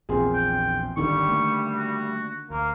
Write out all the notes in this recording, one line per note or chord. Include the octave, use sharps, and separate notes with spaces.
A#1 E2 C4 F4 G#4
G5
G#1 D#2 D3 D#3 G3 C#6
A3 A#3
F#4
D2 A#3